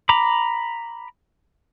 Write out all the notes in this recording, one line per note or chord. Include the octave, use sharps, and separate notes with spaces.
A#5 B5 D6